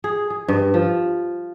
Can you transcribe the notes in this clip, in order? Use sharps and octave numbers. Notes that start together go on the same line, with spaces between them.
G#4
G#4
G2
F3